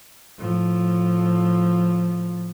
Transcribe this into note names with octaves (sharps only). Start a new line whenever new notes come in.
A2 F3